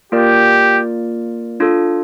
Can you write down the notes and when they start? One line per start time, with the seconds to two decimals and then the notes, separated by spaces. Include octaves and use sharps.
0.12 A#3 F4 G4 A#4 D5
1.60 D4 F4 A4